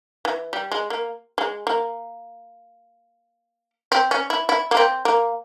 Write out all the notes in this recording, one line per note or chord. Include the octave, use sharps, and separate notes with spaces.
E3
G3
G#3
A#3
G#3
A#3
C4
C#4
E4
E4
A#3
C4
A#3